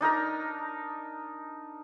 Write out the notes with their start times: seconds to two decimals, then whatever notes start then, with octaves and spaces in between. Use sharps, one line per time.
0.01 D4 D#4 A#4 A#5